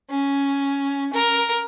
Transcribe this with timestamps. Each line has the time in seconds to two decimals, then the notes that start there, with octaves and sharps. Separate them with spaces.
0.10 C#4
1.13 A#4